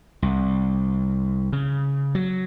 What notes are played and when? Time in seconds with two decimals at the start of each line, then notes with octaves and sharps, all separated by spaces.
0.22 C2
1.53 C#3
2.15 F#3